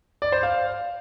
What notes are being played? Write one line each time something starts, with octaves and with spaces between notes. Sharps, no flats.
D5
C5
F5